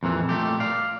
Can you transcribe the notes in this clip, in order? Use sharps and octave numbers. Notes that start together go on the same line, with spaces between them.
F2 A#2 E3
A#2 A3 G4
D5 F5